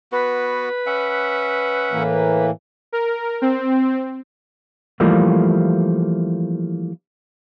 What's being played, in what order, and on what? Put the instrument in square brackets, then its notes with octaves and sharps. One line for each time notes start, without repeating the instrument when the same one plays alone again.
[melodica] B3 F#4 [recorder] B4
[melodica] C#4 E5 F#5
[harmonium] A2 E3 A#3
[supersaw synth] A#4
C4
[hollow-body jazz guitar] E3 F3 G3 A3 A#3